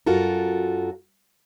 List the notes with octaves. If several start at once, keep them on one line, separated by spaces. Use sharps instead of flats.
F#2 F4 F#4 A4 A#4